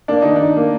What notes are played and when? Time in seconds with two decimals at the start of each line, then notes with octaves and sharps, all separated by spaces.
0.08 A#3 D4
0.22 D#3 D#4
0.36 D4 D#4
0.57 A#3